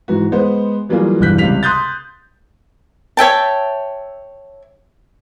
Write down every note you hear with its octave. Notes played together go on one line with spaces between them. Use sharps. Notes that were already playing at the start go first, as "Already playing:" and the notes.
G#2 E3 F#4
G#3 B3 C5 F#5
E3 F#3 G3 A#3 F4 G#4
E1 G2 E3 F#6 G6 B6
C#2 C3 G3 F5 B6 F7
C6 D#6 F#6 G6 A6
C#5 E5 G5 A5